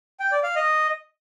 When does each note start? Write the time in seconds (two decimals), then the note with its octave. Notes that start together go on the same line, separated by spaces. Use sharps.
0.20 G5
0.32 D5
0.44 F5
0.55 D#5